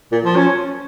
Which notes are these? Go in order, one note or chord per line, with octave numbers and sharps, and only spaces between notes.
A#2
F3
C#4